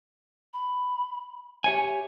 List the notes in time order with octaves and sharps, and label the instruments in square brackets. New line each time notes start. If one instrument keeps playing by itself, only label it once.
[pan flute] B5
[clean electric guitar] G4 C#5 G#5 [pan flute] E5